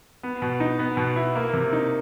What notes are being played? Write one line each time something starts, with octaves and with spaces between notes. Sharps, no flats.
B3
B2
D#4
B3
B2
E4
A#3
C3
D#4